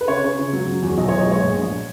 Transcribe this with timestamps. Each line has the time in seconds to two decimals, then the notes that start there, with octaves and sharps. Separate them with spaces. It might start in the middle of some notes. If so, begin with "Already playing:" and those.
0.01 B4
0.08 C#3 C#5
0.24 C#3
0.38 C#3
0.53 F#3
0.68 F#3
0.83 E2
0.97 B1 D#5
1.08 B1 C#5
1.19 D#5
1.27 G#3 C#5
1.42 A#2
1.57 A#1